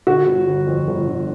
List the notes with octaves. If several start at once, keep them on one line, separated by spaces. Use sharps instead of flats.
D3 F#4
G1
G1
F2
G1
D3